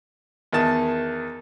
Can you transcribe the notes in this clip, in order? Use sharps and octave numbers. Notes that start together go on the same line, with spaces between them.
E2 D#3 A5